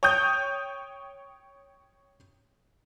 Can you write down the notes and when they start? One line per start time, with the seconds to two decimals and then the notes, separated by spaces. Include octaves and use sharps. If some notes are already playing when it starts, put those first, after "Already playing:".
0.03 C#5 G5 D#6 G6